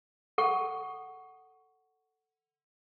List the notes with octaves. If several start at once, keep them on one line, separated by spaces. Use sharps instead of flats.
A4 F#5 C#6